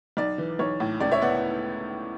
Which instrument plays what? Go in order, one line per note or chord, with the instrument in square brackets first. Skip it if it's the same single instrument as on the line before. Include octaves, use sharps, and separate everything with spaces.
[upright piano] B1 D5
E3
B1 C#5
A2
C#2 D5
C#5 E5
B3 D5 F#5